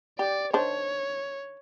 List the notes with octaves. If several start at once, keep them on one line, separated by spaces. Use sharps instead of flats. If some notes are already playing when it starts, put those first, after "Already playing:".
G4 D5
D#3 D4 C5 C#5